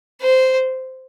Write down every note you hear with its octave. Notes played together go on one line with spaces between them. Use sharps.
C5